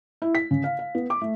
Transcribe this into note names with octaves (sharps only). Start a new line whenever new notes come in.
E4
B6
C#3
F5
F5
B3
D6
A3